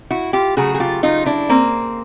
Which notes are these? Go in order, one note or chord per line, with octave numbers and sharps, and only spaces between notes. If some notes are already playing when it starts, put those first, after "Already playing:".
Already playing: A2
E4 F#4
F4 G4
C#3 F#3 A3 F#4 G#4
G#4
F4 G4
D#4 F4
D4 E4
A#3 C4